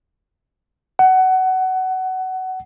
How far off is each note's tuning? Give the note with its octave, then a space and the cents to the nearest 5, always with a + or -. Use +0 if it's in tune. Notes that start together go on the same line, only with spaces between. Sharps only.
F#5 +20